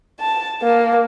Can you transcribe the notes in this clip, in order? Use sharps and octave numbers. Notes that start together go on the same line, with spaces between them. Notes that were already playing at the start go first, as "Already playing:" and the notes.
A5
A#3